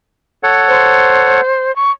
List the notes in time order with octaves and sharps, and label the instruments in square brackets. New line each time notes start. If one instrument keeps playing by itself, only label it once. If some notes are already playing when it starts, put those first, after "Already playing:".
[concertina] A4 C#5 F#5
[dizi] C5
C#6